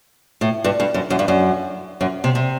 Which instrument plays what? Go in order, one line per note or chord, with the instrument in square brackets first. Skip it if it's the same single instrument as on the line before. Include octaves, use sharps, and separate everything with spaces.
[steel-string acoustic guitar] A2
G2
G2
F#2
F#2
G2
F#2
F#2
C3
C3